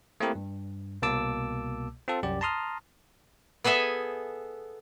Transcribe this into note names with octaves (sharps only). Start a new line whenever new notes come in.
A3 A#3 C4 E4 G4 A#4
G2
C2 B2 A#3 A5 D6 E6
C4 F4 A4
C2 F#2 G4 D5
A5 A#5 C6 D#6 F6
B3 G#4 A4 E5 G#5